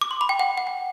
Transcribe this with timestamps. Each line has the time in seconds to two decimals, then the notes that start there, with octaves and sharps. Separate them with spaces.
0.01 D6
0.11 C6
0.21 B5
0.29 G5
0.39 F#5
0.57 F#5
0.67 G5